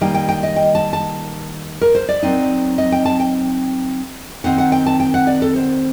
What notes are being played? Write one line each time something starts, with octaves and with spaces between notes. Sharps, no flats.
D#3 G3 A#3 D#4 G5
G5
G5
D#5
G5
A5
A5
A#4
C5
D5
F#3 C4 D#4
D#5
G5
A5
G5
D#3 F#3 C4 D#4 F#5
F#5
G5
A5
G5
F#5
D5
A4
C5